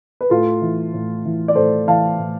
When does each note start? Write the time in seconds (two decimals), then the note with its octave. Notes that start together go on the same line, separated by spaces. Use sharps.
0.21 B4
0.30 A2 F4 A4
0.62 E3
0.94 A2
1.25 E3
1.48 D5
1.55 A2 A4 C5
1.87 E3 F5 A5
2.18 A2